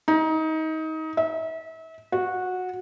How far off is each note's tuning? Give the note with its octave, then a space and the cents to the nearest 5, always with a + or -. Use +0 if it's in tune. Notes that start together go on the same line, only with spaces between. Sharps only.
D#4 +25
E5 -35
F#4 -15